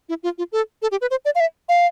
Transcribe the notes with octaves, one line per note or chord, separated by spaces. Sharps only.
E4
F4
F4
A4
A4
G4
B4
C5
D5
F5
E5
F5